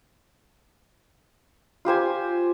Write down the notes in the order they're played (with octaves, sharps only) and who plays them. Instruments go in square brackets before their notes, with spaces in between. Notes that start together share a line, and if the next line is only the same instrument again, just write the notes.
[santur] F4 G4 C5 G#5